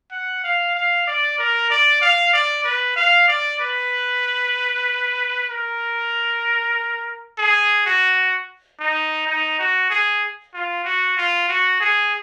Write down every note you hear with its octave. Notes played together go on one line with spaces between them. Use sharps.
F#5
F5
F5
D5
A#4
D5
F5
D5
B4
F5
D5
B4
A#4
G#4
F#4
D#4
D#4
F#4
G#4
F4
F#4
F4
F#4
G#4